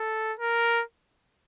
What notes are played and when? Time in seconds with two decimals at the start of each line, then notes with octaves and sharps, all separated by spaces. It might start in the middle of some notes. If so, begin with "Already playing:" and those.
Already playing: A4
0.39 A#4